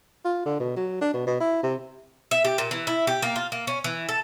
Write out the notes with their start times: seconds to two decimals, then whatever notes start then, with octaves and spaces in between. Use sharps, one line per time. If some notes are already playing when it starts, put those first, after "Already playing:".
0.25 F4
0.46 D3
0.60 B2
0.76 F#3
1.01 D4
1.14 B2
1.27 B2
1.40 E4
1.63 C3
2.31 E5
2.45 G4
2.58 A#2
2.71 E3
2.87 E4
3.07 G4
3.22 A#3
3.36 F4
3.52 A#3
3.67 C#4
3.84 E3
4.09 A4